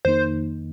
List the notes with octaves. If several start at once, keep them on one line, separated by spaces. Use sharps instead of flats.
F2 D#3 A#3 D#4 C5